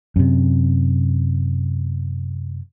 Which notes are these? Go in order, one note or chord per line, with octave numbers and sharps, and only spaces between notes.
F#2 C3